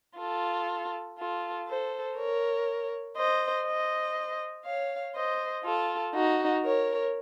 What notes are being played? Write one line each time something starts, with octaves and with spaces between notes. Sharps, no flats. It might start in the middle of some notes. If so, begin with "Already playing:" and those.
F4 A4
F4 A4
A4 C5
A#4 C#5
C5 D#5
C5 D#5
C#5 F5
C5 D#5
F4 A4
D#4 F#4
A#4 C#5